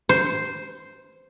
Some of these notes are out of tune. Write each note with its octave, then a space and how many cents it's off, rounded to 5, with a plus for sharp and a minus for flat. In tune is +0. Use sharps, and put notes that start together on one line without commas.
C5 -5